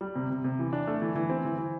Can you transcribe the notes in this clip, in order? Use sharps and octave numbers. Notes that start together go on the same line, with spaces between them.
G3
C3
C3
C3
E3
D4
A3
E3
E3
C4
E3
E3